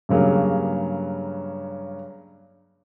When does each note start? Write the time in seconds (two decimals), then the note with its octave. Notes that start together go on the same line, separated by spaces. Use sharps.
0.09 G2 C#3 F#3 A#3